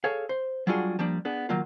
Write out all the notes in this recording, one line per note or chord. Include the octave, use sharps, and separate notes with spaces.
G#4 A4 C#5 F5
C5
F#3 G3 D4 F4 F#4 G#4
F3 G3 A#3 D4
B3 D4 G#4
D#3 F#3 A#3 F4